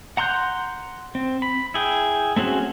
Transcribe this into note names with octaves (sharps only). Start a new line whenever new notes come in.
F#5 A#5 C6 F#6 G6
C4
B5
E4 G#4 G5
A3 C4 C#4 F#4 G#4